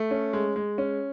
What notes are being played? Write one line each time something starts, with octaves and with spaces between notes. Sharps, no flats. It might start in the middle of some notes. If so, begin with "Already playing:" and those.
Already playing: A3
C#4
G#3
G#3
C#4